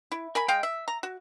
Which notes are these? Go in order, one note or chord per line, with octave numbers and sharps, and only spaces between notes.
E4
A#4 G#5 B5
G#3 D#5 F5 G5
E5
A#5
F#4